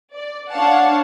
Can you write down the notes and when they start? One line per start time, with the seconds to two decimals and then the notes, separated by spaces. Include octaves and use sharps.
0.14 D5
0.52 D4 C#5 F5 F#5 A5